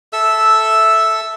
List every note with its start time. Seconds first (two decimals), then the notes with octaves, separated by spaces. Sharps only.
0.13 A4 E5 E6